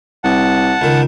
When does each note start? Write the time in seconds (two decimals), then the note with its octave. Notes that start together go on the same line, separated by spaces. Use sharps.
0.24 C2 F#5 A5
0.81 C#2 D#3